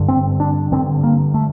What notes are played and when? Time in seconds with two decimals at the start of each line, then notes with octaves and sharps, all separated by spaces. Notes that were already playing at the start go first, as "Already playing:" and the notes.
Already playing: G2 D3
0.08 C4
0.40 D4
0.72 G2 D3 C4
1.03 A#3
1.34 A3